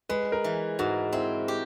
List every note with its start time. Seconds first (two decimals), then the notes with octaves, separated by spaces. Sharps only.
0.09 G#3 B4
0.32 A#4
0.44 E3
0.79 G#2 F#4
1.13 C4 E4
1.48 G4